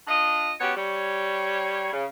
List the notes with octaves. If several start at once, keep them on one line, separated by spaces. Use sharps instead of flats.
D4 F4 D#5
B3 C#4 F#4 G4 C#5
G3 C#5
C#3